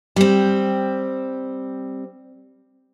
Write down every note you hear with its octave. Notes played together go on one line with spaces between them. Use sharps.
G3 C4